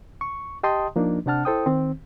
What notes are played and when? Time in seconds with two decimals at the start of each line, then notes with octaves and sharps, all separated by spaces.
0.21 C#6
0.63 G4 D#5 G5 A5 C6 D#6
0.96 F3 A#3 D4 D#4
1.26 C3 C4 D4 F#5 A5 F6
1.45 E4 A4 C5 G5 D#6
1.66 D#3 C4